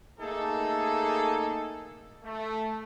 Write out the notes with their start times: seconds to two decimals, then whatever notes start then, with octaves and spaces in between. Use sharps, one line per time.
0.20 A3 A#3 D#4 G#4 A4
2.24 A3